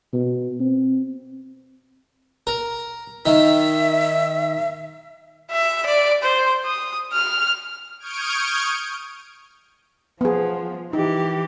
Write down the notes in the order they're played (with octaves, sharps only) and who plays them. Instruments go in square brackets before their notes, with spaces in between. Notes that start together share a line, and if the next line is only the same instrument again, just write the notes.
[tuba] B2
C4
[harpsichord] A#4
[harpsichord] D#3 [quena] E5
[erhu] E5
D5
C5
D#6
F6
[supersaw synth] C#6 D#6 F6 G6 G#6 D7
[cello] F3 [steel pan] B3 G#4
[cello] E3 G4 [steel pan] D#4